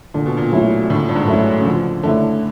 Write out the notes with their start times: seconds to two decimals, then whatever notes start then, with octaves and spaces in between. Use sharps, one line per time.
0.14 A#2 D3
0.26 B2
0.37 A#2
0.52 F#3 A3 C#4 E4
0.83 A#2
0.90 A2 D3
1.09 G2
1.15 G#2
1.28 F#3 A3 C#4 E4
1.60 C#3
1.66 D3 F3
2.03 D3 A3 C#4 E4